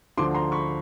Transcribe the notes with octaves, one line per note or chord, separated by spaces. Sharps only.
D2 D3 F3 C6 D6
A#5 C6
B5 C#6